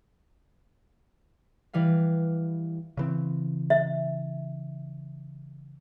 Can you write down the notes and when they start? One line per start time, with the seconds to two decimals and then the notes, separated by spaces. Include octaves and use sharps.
1.73 E3 G3 B4 F5
2.97 C#3 E3 C4
3.70 E5